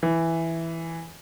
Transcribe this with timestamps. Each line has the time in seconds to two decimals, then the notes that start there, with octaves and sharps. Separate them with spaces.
0.03 E3